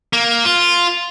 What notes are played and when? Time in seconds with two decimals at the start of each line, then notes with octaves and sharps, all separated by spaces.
0.13 A#3
0.45 F4